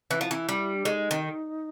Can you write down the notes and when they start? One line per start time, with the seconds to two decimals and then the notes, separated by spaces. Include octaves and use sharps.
0.11 E3 E4
0.21 F3
0.31 E3
0.49 G3
0.75 D4
0.85 G#3 D#4
1.11 D#3